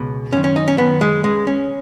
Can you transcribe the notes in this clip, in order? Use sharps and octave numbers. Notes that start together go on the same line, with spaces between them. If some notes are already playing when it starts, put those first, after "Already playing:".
Already playing: C#2 B2
F#2 D#3 C#4
C#4
D#4
C#4
F#2 D#3 B3
G#3
C#2 C#3 G#3
C#4